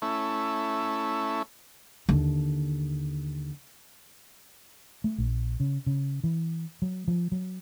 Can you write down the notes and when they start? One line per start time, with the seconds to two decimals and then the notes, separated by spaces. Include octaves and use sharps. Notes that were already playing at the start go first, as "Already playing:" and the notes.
0.02 A3 C#4 E4
2.09 D#2 D3
5.04 A3
5.18 A#1
5.60 C#3
5.86 C#3
6.24 E3
6.82 F#3
7.08 F3
7.32 F#3